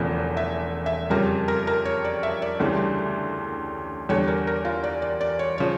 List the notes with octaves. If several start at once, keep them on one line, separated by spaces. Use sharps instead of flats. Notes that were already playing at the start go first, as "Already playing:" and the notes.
Already playing: E1 E2 C#3 F3 A3
E5
E5
F2 C#3 G3 A#4
A#4
A#4
C#5
D5
E5
D5
D2 C#3 E3 G3
E2 D3 G3 C#5
A#4
A#4
F4
D5
D5
D5
C#5
C#3 F3 C#5